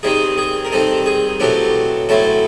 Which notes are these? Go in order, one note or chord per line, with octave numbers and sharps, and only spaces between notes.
D#3 G3 C4 D#4 G#4
G#4
A#4
D#3 G3 C4 D#4 A4
G#4
B2 F#3 A3 C4 E4 G4
B2 F#3 A3 C4 E4 A4